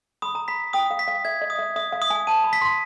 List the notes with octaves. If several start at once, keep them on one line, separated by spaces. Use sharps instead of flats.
B5 D#6
A#5
B5 B6
G5 D#6
F5
B6
F5
E5 G#6
D#5
D#6
E5
E5 D#6
F5
D#6
G#5
A5 D#7
B5
B6
C6